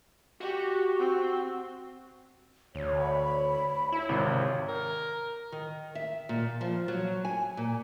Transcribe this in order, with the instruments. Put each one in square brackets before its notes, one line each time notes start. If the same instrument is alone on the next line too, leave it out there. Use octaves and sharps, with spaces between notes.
[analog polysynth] F#4 [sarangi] G4
[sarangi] C4
[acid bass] D2 [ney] C#5
[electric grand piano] C#5 [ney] B5
[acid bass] E4 [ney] C#5
[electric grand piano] G#1 [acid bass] C3
[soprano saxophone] A#4
[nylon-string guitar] D#3
E5
A#2
F3
F#3
G#5
A#2